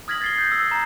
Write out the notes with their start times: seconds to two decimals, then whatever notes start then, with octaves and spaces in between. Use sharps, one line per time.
0.08 D#6 F6 G#6 A#6 B6 F#7
0.22 A6 C7 G7
0.39 G6
0.52 E6
0.71 A#5